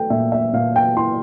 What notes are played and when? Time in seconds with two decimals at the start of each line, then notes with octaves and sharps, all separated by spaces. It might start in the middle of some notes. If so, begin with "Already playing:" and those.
Already playing: A3 G5
0.10 A#2 E5
0.32 E5
0.53 A#2 F5
0.76 G5
0.96 E4 C6